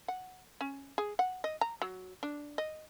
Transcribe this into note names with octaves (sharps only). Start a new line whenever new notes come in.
F#5
C#4
G#4
F#5
D#5
A#5
F#3
D4
D#5